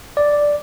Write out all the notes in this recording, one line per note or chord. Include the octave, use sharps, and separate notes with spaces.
D5